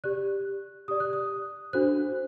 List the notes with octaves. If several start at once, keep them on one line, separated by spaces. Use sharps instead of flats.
G4 D5 F#6
G4 D5 D#6
F#6
D#6
D4 F#4 A4 C5 F#6